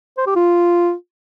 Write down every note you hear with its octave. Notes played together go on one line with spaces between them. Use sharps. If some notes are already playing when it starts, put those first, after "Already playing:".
C5
G4
F4